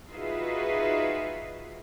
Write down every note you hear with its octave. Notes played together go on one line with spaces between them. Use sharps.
D#4 F4 F#4 G#4 B4 E5